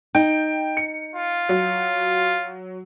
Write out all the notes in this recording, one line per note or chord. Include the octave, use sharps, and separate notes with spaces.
D#4 G5
C#7
F4
F#3